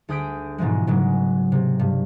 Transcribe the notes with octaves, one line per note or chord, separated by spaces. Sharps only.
D2 G#4 D#6 G6 B6 D7
G#2 B2 E3 F3 G#3
G#2 C#3 F#3 G#3
C3
G2